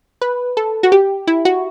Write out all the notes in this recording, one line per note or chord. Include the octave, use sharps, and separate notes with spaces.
B4
A4
F#4
G4
E4
F#4